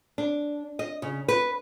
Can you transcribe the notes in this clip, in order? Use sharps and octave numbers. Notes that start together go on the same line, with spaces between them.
D4
D#5
C#3
B4